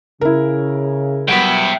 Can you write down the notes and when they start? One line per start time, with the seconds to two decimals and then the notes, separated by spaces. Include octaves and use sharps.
0.21 C#3 E4 A#4
1.28 F#3 G3 B3 E5 G5